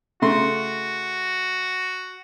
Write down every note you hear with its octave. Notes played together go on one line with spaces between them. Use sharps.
C#3 A3 F#4 C6